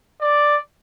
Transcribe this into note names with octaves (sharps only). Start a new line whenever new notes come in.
D5